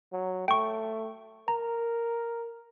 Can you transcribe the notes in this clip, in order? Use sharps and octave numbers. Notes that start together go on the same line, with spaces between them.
F#3
A3 G5 C#6
A#4 A#5